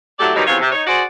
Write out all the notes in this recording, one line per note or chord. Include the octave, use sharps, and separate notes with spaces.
F#3 A3 E4 G4 A4 D5
B2 D#3 F#3 G3 D#4
E2 C3 F3 F4 C#5
C3
D#4 C#5
F#4 G#4 C5 D5